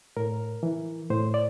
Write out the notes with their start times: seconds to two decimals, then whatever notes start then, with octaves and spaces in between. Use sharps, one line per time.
0.17 A2 A#4
0.63 E3
1.10 A2 C5
1.34 D5